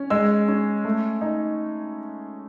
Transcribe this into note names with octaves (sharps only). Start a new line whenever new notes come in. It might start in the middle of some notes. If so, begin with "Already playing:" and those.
Already playing: C#4
G#3 E6
C#4
A3
D#4